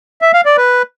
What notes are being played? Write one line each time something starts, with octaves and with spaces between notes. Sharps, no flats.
E5
F5
D5
B4